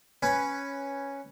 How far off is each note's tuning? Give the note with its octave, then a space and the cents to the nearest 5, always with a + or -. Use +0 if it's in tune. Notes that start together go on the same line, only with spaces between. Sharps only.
C#4 +0 B4 +0